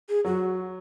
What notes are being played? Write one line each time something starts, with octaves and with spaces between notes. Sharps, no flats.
G#4
F#3 F#4